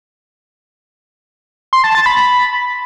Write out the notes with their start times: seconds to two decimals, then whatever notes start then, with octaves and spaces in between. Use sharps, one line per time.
1.73 C6
1.84 A5
1.95 A6
2.06 B5